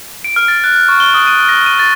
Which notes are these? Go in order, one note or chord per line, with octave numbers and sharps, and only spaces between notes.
D7
F6
A6
F#6
F#6
C#6
G7
D#6
D#7
A#6
D#7
A6